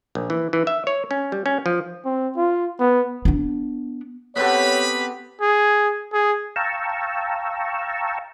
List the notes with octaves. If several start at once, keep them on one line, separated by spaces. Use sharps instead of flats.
A#1
E3
E3
E5
C#5
C#4
G3
C#4
F3
C4
F4
B3
B3 D4
B3 C4 G4 A4 B4 C#5 B5
G#4
G#4
F5 G5 A5 A#5 C#6 E6